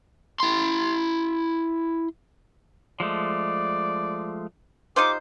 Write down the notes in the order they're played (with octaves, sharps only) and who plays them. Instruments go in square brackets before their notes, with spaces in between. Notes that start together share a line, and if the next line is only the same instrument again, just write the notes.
[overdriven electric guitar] E4 C6
[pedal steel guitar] F3 G#3 A3 [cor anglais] D5
[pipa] D#4 F4 C5 [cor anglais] G4 [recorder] D6